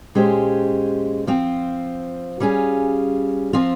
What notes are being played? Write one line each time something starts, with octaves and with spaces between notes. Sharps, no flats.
A#2 G#3 C#4 G4 C5
F3 C4 F4
G3 C#4 F4 G#4
F3 C4 F4